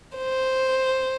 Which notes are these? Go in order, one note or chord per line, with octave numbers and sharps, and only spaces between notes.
C5